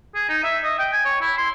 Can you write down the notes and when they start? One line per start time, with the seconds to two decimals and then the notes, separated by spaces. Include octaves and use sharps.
0.15 G#4
0.29 D#4
0.44 E5
0.64 D#5
0.79 G5
0.93 G#5
1.05 C#5
1.21 E4
1.38 C6